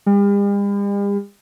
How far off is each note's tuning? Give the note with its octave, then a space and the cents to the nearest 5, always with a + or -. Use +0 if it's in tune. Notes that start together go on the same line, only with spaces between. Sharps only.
G3 +45